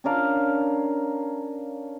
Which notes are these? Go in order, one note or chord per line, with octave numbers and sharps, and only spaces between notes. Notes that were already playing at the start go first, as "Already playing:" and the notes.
C#4 D4 A#4 F5